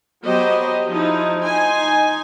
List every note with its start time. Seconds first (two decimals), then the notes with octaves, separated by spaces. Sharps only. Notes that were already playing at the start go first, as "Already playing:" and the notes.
0.23 F#3 B3 G4 C5 D#5
0.91 F3 D#4 E4
1.43 D#4 G#5 C6